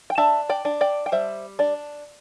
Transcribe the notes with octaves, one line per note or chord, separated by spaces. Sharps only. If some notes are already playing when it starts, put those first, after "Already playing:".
G5
D4 E5 A5
D5 G5
D4
D5 G5
G5
G3 C5 E5
D4 D5